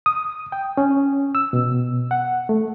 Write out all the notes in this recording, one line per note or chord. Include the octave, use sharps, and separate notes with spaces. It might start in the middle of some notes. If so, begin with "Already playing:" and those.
D#6
G5
C#4
E6
B2
F#5
A3